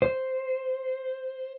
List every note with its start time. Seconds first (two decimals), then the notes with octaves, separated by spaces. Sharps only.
0.02 C5